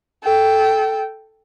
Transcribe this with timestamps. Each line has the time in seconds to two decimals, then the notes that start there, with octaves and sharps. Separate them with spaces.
0.24 A4 G5